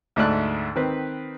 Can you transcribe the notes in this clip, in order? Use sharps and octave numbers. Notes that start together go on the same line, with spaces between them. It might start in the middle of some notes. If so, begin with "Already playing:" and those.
D2 G#2 A3 D5 F#6
D#3 C4 B4